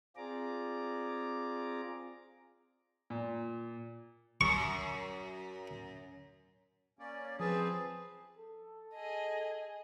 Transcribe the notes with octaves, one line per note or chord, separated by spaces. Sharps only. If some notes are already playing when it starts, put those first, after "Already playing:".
C4 F4 G#4 D5 A#5 D6
A#2
F#2 C#6
A#3 C#4 D5
F3 C4 G#4 B4 A5
A4
G#4 D#5